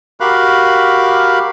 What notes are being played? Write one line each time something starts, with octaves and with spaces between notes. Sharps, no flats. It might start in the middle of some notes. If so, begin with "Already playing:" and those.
F#4 G4 A#4 F5 B5 F#6